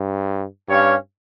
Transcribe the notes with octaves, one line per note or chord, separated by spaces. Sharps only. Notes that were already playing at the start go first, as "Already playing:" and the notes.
Already playing: G2
G2 C#4 G4 C#5 F5